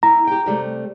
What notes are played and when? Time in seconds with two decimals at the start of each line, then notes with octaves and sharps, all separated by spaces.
0.03 E4 A#5
0.27 G4 G5
0.46 C3 G3 A3